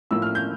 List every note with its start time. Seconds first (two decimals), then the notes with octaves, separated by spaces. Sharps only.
0.11 A2 F3 A#3 E6
0.22 F6
0.35 G6